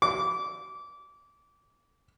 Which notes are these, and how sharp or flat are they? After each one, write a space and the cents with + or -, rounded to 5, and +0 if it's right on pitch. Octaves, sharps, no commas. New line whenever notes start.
D6 -25